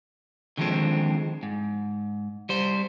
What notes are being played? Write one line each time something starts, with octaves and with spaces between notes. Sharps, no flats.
D3 D#3 F3 G3 G#3 C4
G#2
G3 C5